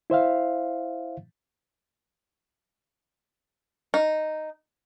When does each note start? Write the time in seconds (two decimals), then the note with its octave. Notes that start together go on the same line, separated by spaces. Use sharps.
0.10 E4 C5 E5 F5
3.94 D#4